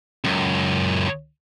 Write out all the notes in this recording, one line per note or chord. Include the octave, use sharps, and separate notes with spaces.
C#2 F#2